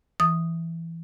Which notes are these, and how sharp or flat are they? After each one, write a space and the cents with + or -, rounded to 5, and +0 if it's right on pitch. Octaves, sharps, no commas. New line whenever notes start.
E3 +10 D#6 -5